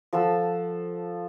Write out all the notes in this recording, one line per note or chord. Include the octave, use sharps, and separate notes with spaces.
F3 A4 F#5 E6